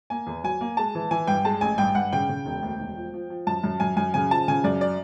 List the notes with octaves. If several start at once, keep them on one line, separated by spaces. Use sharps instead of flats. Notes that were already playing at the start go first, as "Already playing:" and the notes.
A#3 G#5
E2
F#3 G#5
A#3
G#3 A5
E3
E3 G#5
G2 G5
G#3 A5
A1 G#5
G2 G5
G2 F#5
C#3 G5
C#3
E1
D2
E1
F3
F3
F3
F#2 A5
F#2
F#2 G#5
F#2 G#5
C#3 G#5
F3 A5
C#3 G#5
F#2 D5
D5